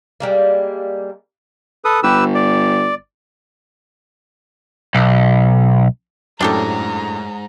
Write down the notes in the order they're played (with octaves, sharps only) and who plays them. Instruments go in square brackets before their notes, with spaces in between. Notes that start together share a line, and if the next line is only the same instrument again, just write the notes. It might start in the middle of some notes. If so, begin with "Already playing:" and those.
[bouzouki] G3 G#3 A#3
[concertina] A4 B4 D#6
[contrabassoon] G1 [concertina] G4 B4 E6
[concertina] D5
[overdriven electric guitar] B1
[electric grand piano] F#2 A2 [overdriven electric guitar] G#3 C5 [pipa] D4 G4 A4 [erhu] A#5